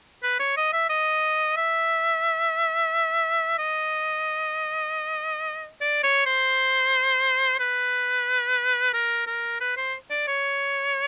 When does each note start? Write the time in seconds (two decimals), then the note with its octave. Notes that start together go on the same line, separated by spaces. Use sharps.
0.23 B4
0.40 C#5
0.57 D#5
0.73 E5
0.89 D#5
1.57 E5
3.59 D#5
5.81 D5
6.04 C#5
6.26 C5
7.60 B4
8.94 A#4
9.27 A#4
9.61 B4
9.77 C5
10.11 D5
10.28 C#5